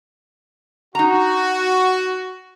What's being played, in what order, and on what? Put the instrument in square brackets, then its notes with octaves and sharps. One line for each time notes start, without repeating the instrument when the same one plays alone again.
[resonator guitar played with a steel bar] D#4 A#5 [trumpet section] F#4